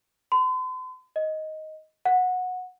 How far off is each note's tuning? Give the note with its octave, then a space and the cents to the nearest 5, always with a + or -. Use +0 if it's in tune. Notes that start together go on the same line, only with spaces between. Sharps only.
C6 -45
D#5 +5
F#5 -15